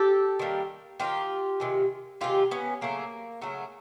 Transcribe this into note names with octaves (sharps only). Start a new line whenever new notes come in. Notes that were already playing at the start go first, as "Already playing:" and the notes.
Already playing: G4 A4
D#3 G3 A#3
D#3 G3 A#3 F4 G4
C3 D#3 G#3
C3 D#3 G#3 F4 G4
B3 C#4
C#3 F#3 A3 A#3
C#3 F#3 A3